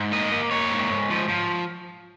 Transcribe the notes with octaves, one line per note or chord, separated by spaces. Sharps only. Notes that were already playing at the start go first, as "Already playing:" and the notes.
Already playing: G#2
A#3 D#5
A#3
A#3 C#5
G#2
G#2
F3
F3